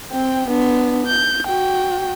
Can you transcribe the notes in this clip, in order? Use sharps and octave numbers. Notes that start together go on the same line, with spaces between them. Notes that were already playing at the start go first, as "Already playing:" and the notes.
C4 G5
B3 D4
G6
F#4 G5